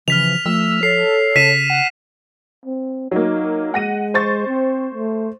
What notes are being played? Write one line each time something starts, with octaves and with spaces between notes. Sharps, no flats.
C#3 E3 F3 F6 B6 F7
F3 A3 E6
A4 C#5 C7
C#3 B6 D#7 E7
F#5
C4
F#3 A#3 D#4
G#3 F#5 A#6 D#7
C5 C#6 A6
C4
A3